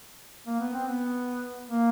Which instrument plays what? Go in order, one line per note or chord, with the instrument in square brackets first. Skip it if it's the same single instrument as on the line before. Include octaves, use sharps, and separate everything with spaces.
[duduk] A#3
B3
C4
B3
A#3